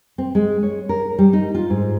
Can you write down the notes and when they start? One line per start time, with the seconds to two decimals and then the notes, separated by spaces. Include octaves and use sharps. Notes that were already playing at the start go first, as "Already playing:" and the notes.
0.18 C4
0.35 G#3
0.63 C#5
0.89 A#4
1.18 G3
1.33 D#4
1.55 F4
1.70 G#2